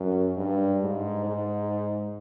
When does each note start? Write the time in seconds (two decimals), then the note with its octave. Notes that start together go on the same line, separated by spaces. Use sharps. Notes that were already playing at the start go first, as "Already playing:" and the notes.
Already playing: F#2
0.36 G2
0.82 G#2
1.25 G#2